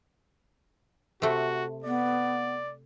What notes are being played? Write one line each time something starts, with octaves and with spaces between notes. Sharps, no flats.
C3 A3 F#4
B3 D5